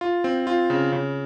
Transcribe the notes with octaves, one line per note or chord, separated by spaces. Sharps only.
F4
C4
F4
C#3
C#3